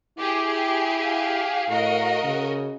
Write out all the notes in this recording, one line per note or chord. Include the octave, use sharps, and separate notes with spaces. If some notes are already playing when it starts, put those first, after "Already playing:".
E4 G4 G#4 D6
F5
A2 F#4 A#4 D#5
C#3